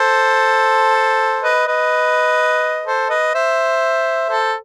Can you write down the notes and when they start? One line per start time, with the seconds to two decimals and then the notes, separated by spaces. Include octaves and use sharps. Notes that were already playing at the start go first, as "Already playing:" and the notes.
Already playing: A4 C5
1.43 B4 D#5
1.67 B4 D#5
2.86 A4 C5
3.10 B4 D#5
3.34 C5 E5
4.29 A4 C5